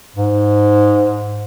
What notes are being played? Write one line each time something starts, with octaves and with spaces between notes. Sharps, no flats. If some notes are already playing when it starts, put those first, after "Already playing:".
G#2